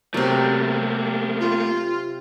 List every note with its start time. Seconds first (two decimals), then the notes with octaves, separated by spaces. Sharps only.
0.14 C3 F#3 A3 A#3
1.40 F4